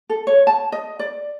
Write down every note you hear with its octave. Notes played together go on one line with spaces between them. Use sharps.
A4
C#5
A5
D#5
D5